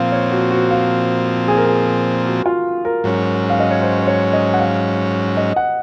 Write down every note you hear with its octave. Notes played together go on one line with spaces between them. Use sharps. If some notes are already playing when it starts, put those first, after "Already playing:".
Already playing: A#2 F3 C4 F5
C#5
F#4
F#4
F5
G#4
A#4
G#4
F#4
F4
A#4
G#2 F#3 C#4
F5
D#5
C#5
C5
C5
C#5
D#5
F#5
F5
D#5
F#5